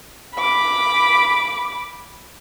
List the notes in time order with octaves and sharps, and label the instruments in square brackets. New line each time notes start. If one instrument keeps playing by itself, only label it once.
[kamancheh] B5 D6